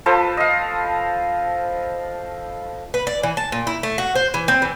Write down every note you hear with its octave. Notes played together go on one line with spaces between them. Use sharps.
F3 A4 B4 C5
D#5 F5
B4
D5
E3
A5
A#2
E4
A3
F#4
C5
E3
C4
E3